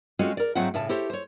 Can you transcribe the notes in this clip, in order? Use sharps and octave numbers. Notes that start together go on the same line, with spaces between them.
G#3 C4 C#4 F4 F#4 A4
A#4 D5
G#2 F#3 A3 C4 F4 F#5
A2 C#3 E5 A5
E4 G4 A4 C5 C#5
C5 C#5